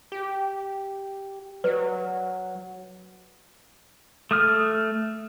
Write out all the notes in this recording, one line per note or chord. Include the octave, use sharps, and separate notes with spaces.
G4
F#3 B4 D5
A3 D#6 F6